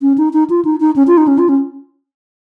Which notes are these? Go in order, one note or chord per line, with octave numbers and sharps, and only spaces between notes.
C#4
D#4
D#4
F4
D#4
D#4
C#4
F4
D#4
C#4
F4
C#4